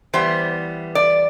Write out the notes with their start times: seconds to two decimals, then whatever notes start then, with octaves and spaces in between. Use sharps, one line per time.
0.13 E3 G3 B3 C5
0.95 D5